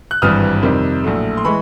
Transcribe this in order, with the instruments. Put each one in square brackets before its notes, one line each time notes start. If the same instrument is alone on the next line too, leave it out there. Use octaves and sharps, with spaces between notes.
[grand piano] F#6
G#1 G2 E3 G3 D#6 F6
F2 C3 D#3 G3
A#1 A2 F#3 A3
C6
E3 G#3 B5 C#6